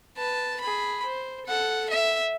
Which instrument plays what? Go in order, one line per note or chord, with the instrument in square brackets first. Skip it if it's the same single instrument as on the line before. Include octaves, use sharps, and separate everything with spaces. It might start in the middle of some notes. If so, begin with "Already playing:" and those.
[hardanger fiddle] B4 A5
G#4 B5
C5
A4 F#5
E5